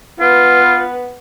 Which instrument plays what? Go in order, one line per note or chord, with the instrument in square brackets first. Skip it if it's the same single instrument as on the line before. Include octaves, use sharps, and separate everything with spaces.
[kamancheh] B3 B4 [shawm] F4